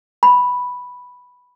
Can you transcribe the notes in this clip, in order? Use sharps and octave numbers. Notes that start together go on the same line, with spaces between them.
B5